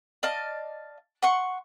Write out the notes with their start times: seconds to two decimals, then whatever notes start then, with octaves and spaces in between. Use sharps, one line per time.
0.23 D5 D#5 F5 A5
1.22 F#5 C6 C#6